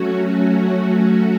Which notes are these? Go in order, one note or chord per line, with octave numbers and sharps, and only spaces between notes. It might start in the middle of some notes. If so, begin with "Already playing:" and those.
Already playing: F#3 A3 C#4 F#4
F#3 A3 C#4 F#4